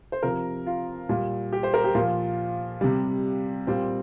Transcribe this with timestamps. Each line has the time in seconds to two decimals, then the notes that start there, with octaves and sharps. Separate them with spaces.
0.12 C5
0.23 C3 F3 A#4
0.66 F4
1.09 A#2 G3
1.53 G4
1.63 C5
1.74 A#4
1.84 G4
1.94 A#2 F3 F4
2.81 C3 G3
3.67 A#2 G3 C4